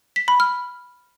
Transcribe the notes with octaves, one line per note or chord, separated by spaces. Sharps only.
B6
B5
F6